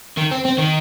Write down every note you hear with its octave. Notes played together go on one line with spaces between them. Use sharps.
D#3
C4
C4
D#3